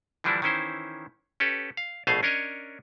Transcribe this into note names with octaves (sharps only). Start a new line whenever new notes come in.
D3 E3 F3 G3 D4 E4
D#3 E3 C#4 E4 C5
C#4 G4 A4 B4
F5
A#1 B2 A3 G#4 C5 F5
C#4 D4 A#4 C#5 D#5